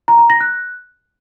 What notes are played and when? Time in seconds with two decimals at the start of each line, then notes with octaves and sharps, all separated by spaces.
0.08 A#5
0.19 A#5
0.30 A#6
0.41 F#6